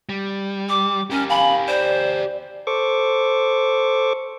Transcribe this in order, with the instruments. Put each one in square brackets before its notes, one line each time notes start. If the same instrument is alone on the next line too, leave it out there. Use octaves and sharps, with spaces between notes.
[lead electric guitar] G3
[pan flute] D6
[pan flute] C#4 [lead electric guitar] G4 A#4
[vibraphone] F5 G#5 [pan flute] B5
[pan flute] C5 [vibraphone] D5
[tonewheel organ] A4 C5 C#6 D6